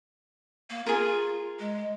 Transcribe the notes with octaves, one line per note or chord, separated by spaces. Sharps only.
A#3
F4 G#4 A#4
G#3